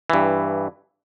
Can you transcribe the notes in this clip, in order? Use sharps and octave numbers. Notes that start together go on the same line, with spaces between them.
G2 E3